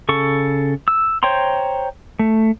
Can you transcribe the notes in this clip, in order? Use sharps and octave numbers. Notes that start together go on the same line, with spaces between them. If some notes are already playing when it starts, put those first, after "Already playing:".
C#3 A4 C#6
E6
C5 C#5 G5 A#5 C6
A3